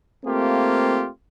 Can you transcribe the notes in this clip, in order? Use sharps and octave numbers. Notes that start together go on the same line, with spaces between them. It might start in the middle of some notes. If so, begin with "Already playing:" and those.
A3 A#3 C4 F4 G4